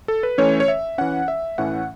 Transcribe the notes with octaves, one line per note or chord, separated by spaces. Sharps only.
A4
B4
E3 A3 C#4 C#5
C#5
E5
E3 C#4 F#5
E5
A2 E3 A3 C#4 F#5